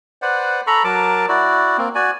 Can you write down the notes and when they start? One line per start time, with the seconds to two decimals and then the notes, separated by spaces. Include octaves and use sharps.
0.22 B4 C5 D5 F#5
0.67 A4 A#5 B5 C#6
0.84 F#3 A#4 A5 D6
1.28 E4 F#4 D5
1.78 A#3 C4
1.95 F#4 D5 G#5